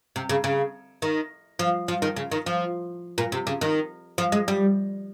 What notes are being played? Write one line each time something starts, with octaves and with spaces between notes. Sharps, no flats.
C3
C#3
C#3
D#3
F3
F3
D#3
C#3
D#3
F3
A#2
C3
C#3
D#3
F3
G#3
G3